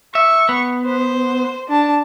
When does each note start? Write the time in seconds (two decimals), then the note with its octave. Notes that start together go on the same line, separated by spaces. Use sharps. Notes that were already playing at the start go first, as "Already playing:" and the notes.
0.15 E5 C#6
0.49 B3
0.85 C5
1.68 D4 A5